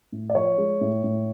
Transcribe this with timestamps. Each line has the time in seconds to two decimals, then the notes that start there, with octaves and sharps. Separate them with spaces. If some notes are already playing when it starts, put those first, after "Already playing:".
0.12 A2
0.30 D5
0.35 F3 C#5
0.58 G#3
0.81 A2
1.04 A2